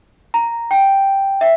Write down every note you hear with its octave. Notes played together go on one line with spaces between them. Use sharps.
A#5
G5
E5